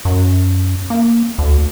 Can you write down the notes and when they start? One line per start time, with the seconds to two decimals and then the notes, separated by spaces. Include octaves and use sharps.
0.05 F#2
0.90 A#3
1.39 D2